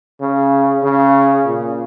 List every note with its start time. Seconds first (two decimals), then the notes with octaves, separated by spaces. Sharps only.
0.21 C#3
0.83 C#3
1.45 A#2